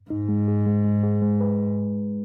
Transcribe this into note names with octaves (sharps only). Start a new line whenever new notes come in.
G#2 D#4
G#3
G#4
G#3
G#3
G#4
G#3
B4